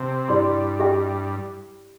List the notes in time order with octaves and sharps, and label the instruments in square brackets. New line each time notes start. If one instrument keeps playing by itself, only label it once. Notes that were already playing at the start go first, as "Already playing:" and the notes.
Already playing: [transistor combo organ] C3 [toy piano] A5
[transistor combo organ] G2 [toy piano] E4 G4 D5 C6
[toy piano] G4 E5 G5